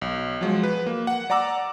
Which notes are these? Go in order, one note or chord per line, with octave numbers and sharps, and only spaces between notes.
B1
F3 F#3 G#3
B4
A#3
F#5
D5 F#5 A#5 D6 E6